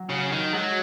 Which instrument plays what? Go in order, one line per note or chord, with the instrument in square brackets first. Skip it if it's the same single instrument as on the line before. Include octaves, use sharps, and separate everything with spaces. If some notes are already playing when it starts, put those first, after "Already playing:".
Already playing: [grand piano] F#3
[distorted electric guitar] C#3 [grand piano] F#4
[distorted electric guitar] D#3 [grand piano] F#4
[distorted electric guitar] F#3 [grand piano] G#3